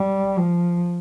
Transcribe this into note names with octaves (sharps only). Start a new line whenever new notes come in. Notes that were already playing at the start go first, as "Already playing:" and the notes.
Already playing: G3
F3